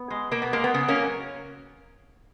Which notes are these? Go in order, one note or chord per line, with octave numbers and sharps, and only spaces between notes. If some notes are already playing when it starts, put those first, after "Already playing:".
Already playing: B3
G#3
B2 A#3
B3
G#3 A#3
B3
C#3 B3
A#3 C#4
F#3